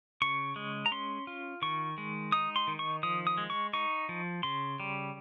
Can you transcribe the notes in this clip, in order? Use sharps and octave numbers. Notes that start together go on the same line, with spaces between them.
C#3 C#6
G#3
A#5
C#4 C6
F4
D#3 C#6
G#3
D#4 D#6
C6
D#3
C#6
F3 D#6
D#6
G#3
C#6
D#4 C#6
F3
C#3 C6
G3